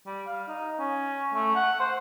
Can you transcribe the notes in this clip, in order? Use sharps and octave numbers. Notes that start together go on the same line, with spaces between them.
G3
F5
D#4
C#4
A3
F#5
C5